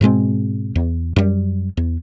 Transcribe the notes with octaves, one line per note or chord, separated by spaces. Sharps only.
G#2 B2 G#3 C4
E2
F#2 G3
E2